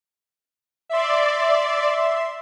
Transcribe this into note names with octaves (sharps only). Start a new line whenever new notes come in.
D5 E5 C6